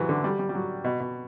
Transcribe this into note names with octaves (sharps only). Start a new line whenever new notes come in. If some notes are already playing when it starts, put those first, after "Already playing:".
Already playing: C3 E3 F#3
D3
G3
G3
G3
F#3
B2
B2